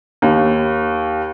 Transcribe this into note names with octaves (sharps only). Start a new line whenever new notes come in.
D#2